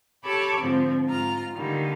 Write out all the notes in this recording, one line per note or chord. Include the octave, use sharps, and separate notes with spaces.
G4 A4 C#5 A5 B5 D6
G#2 D3 F3 C4
G#2 F4 A#5 F6
D3 D#3 G3 A#3